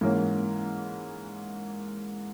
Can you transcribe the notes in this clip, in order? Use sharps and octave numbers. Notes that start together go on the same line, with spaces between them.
G#2 E3 A#3 C#4